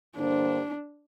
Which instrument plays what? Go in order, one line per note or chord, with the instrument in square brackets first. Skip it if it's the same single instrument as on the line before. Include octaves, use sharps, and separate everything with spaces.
[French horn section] G2 D3 A#3 G4 C5 [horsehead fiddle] D4